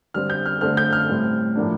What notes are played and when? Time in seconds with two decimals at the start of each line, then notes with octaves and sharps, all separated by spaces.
0.14 D3 G3 C4 F6
0.30 G6
0.46 F6
0.61 D3 A3 C4 F6
0.77 G6
0.93 F6
1.09 A2 G3 C4
1.56 A2 F3 A#3 D4